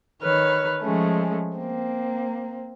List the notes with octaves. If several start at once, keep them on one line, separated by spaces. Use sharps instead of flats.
D#3 B4 C#5 F6
F3 G#3 A3 C#4
A#3 C4